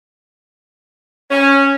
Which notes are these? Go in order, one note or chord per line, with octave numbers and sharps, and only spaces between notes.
C#4